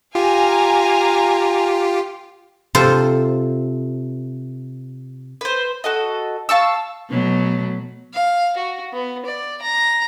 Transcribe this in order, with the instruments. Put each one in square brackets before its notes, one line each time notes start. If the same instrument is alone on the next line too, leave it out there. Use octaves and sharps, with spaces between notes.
[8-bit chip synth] F4 G4 [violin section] F5 G#5 A#5
[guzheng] C3 F4 A4 C5
[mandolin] B4 C5
F#4 A4 D#5
F5 A5 C#6 E6
[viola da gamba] B2 F#3 A3
[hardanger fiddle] F5
F#4
B3
D5
A#5